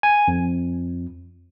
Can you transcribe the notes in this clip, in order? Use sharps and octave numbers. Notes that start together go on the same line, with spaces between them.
G#5
F2